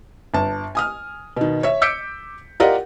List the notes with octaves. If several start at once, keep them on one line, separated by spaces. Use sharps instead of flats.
G1 A5
G#5 D#6 F6
B2 D#3
C#5 E5
D6 E6 G6 B6 C#7 D7
F4 G4 A#4 D5 D#5 F#5